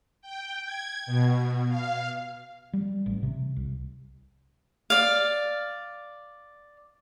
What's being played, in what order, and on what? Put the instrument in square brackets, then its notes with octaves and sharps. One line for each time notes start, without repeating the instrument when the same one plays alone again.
[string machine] G5
G#6
B2
F5
[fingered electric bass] G3
A1
C3
C2
[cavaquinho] D5 F5